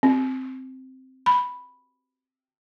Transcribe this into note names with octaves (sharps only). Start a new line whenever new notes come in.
C4
B5